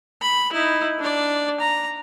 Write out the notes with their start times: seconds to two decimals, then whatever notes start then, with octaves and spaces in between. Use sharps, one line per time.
0.21 B5
0.53 D#4 E4
0.99 D4 D5
1.60 A#5